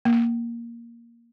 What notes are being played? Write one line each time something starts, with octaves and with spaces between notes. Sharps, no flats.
A#3